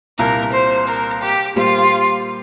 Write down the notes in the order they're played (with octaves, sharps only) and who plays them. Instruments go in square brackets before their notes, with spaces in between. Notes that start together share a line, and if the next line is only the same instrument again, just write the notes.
[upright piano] C2 A#2 A#3 [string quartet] A#4
[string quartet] C5
A#4
G4
[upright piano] A#2 G3 A#3 G4 C5 [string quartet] F4